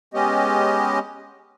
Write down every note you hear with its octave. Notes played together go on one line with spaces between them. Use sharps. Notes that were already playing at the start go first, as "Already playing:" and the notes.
G#3 B3 C#4 G4 D#5